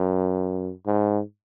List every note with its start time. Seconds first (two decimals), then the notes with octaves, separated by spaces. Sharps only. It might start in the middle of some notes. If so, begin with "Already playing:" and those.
Already playing: F#2
0.86 G#2